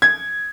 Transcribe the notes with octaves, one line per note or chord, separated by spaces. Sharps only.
G#6